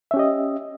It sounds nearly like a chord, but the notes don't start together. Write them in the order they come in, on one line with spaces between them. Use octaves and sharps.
E5 C#4 G4 D#5